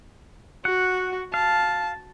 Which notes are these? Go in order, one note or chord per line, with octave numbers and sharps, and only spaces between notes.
F#4 F#5
F5 A5